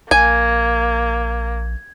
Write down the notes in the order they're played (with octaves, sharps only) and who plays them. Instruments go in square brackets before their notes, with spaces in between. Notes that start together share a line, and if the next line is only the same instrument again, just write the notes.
[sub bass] A#1 [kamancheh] A#3 [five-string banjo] G#5 [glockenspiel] G#6